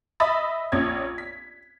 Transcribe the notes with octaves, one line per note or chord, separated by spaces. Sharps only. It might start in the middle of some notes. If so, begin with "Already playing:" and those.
D#5 E5 B5 D#6 A6
A#1 C#4 G#6
B6